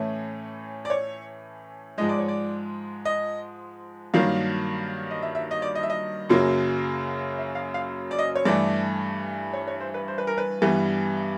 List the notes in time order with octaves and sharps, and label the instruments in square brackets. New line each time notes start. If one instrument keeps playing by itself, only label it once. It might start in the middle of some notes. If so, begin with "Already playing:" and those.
Already playing: [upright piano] A2 E3 A3 C#4
D5
C#5
G#2 F3 G#3 D#5
D5
C#5
D5
D#5
G2 D#3 F#3 A#3 F5
D#5
E5
E5
D#5
D5
D#5
E5
D#5
F#2 C#3 F#3 A#3
E5
F5
F5
D5
D#5
C#5
G2 E3 A3 D5
C#5
C#5
C5
B4
C5
B4
A#4
B4
G2 E3 G3 B3